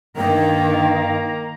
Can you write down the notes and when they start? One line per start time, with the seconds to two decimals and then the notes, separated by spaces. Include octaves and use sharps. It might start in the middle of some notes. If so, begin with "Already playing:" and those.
0.17 G2 D#3 A#3 G5 A#5